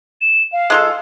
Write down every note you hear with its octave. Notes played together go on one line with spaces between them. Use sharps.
E7
F5
G#3 F4 A4